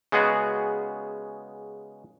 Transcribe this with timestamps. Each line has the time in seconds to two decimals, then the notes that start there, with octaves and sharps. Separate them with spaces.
0.12 C#3 G#3 B3 F#4 G#4